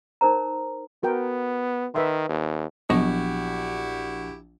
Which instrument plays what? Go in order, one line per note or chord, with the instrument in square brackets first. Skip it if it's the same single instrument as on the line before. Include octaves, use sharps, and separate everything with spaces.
[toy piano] D#4 A#4 C5 A#5
[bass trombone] B3 [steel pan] F#4 A#4 G5
[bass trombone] D#3 [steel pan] B4 E5 C6
[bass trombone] D#2
[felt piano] A#1 [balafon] F#3 B3 C#6 [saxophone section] E4 F#4 G4